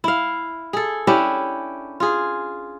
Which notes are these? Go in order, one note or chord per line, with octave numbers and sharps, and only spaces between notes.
E4 F5
G#4 A4
C#4 D4 E4 G4
F4 G#4